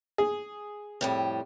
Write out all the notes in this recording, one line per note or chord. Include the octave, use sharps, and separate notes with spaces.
G#4
F2 A2 G3